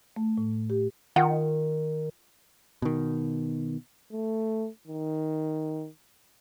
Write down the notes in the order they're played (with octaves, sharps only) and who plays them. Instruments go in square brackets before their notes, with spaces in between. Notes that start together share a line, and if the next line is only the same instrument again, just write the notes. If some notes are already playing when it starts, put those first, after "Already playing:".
[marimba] A3
A2
G4
[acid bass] D#3 [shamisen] F4 F#5 G5
[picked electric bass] B2 D#3
[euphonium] A3
D#3